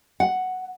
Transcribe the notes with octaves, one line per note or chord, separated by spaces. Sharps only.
F#5